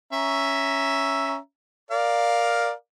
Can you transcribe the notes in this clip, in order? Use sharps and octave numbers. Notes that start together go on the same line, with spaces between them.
C#4 E5 A#5
A#4 D5 F5